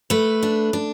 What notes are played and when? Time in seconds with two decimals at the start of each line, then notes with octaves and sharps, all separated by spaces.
0.10 A3 B4
0.43 D4
0.73 D4